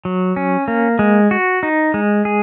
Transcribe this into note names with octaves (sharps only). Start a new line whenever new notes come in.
F#3
C#4
A#3
G#3
F#4
D#4
G#3
G#4